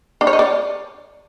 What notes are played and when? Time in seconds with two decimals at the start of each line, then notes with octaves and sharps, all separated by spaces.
0.21 D4
0.27 C#5
0.33 D#5
0.39 D5